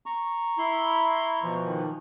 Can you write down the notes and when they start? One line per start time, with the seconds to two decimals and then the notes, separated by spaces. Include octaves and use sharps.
0.06 A#5 C#6
0.58 E4 C6
1.43 B2 E3 F3
1.65 D#3